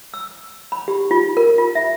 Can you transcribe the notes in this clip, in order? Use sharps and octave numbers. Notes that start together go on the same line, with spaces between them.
E6
B5
G4
F4
A#4
F4
E5